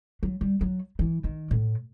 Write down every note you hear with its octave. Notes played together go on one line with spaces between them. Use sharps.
F#3
G3
F#3
E3
D#3
A2